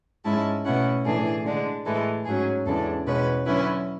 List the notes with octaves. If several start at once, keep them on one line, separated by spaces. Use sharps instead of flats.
G#2 G#3 C#4 E4 A5
B2 A3 C#4 E4 F#5
A2 E3 A3 D4 G#4
D3 G#3 D4
A2 E3 G#3 A4
G#2 F#3 C#4 G#4
E2 C#3 G#3 D4 A4
E2 B2 G#3 C#4 B4
D3 F#3 C#4 E4 B4